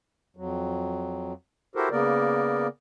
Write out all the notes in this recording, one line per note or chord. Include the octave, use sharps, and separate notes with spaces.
F2 F#3
E4 F#4 G4 A4 A#4 C5
C#3 A#3 B3 A#4 D5